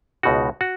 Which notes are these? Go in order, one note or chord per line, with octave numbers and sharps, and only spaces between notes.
C#2 B2 G#3 D#4 F#4
F#4